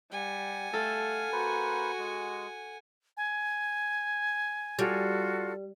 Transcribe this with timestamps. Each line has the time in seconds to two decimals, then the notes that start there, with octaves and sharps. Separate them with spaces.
0.11 G3 F#5 G#5
0.73 A3 A4 F5
1.32 A#3 F#4 B4 C5
1.99 G#3
3.17 G#5
4.79 G3 F4 F#4 A4